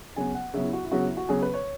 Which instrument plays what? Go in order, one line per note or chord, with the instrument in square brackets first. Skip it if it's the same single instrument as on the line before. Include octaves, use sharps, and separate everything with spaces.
[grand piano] C#3 F#3 B3 G#5
F#5
C#3 F#3 B3 E5
E4
F#4
E4
C#3 F#3 B3 F#4
E4
F#4
C#3 F#3 B3 G#4
B4
C#5